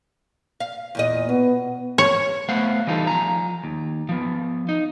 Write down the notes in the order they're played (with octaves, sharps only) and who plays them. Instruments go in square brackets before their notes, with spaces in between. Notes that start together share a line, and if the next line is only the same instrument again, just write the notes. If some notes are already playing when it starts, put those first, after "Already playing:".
[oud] F5
E2 A#2 D#5
[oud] B2 [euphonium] B3
[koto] C#5
[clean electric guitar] A3 B3 C5 F5 F#5
E3 G3 D#4 F4 A4
F3 G#5 A#5
D#2
F3 B3
D#4